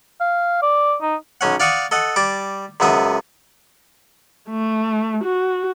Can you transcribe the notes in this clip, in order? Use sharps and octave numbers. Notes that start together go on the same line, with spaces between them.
F5
D5
D#4
B1 C#4 F#5
D5 F5 F#5 C#6 D#6
A4 D#5 F#5
G3 A5 D6
C#2 F#2 B3 E5 D#6
A3
F#4